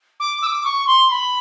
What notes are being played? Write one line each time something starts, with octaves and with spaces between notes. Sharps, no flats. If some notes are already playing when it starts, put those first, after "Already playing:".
D6
E6
D6
C#6
C6
B5